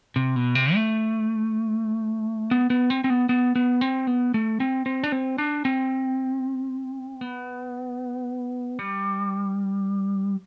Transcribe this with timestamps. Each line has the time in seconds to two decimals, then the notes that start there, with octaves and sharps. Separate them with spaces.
0.16 C3
0.36 B2
0.55 C3
0.74 A3
2.51 B3
2.70 B3
2.90 C4
3.04 C4
3.10 B3
3.29 B3
3.55 B3
3.81 C4
4.07 B3
4.34 A3
4.60 C4
4.86 C4
5.04 D4
5.12 C4
5.38 D4
5.65 C4
7.21 B3
8.79 G3